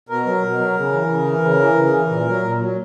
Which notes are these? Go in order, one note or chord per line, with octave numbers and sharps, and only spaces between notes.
B2 A#4
F#3
B2
F#3
C#3
E3
C#3
E3
C#3
E3
C#3
E3
A#2
F#3
A#2
F#3